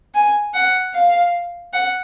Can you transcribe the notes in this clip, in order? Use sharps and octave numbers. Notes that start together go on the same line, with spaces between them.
G#5
F#5
F5
F#5